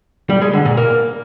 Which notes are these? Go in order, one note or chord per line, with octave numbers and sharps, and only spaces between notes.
G3
G#3
D3
A#2
A#3